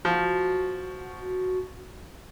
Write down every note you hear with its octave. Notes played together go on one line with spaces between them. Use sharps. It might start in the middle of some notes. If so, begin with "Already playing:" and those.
F3 F#4